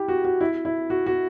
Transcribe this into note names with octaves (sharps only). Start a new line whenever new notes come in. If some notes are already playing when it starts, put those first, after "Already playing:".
Already playing: E4 G4
F#4
F#4
E4
E4
F#4
F#4